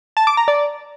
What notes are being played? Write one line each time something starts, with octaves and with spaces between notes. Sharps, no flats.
A5
D6
A#5
D5